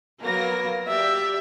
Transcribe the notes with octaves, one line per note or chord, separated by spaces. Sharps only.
F#3 A#3 B3 A#4 A#6
G4 D5 E5